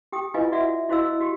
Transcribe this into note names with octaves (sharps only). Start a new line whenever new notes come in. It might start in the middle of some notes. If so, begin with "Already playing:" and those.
G4 G5 D#6
E4 F4 B4 D#5 F5 G#5
F#4 D5 E5 F#5
E4 F#4 C5 D#5 F5 E6
F#4 G4